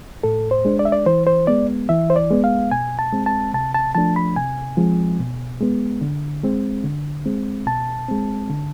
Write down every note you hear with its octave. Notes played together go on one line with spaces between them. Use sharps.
A2 A4
C5
G#3 D4
D5
E5
D5
E3 C5
C5
G#3 B3 D5
E3 E5
C5
D5
G#3 B3
F5
B2 G#5
A5
G#3 C4
A5
C3 A5
A5
F3 A3 D4 A5
B5
C3 G#5
F3 G#3 C4
B2
G#3 B3
D3
G#3 C4
D3
G#3 C4
B2 A5
G#3 C4
D3